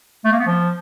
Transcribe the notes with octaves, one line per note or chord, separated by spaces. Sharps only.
A3
A#3
B3
F3